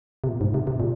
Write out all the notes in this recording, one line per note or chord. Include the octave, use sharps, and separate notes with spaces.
C3
A#2
G#2
C3
C3
A#2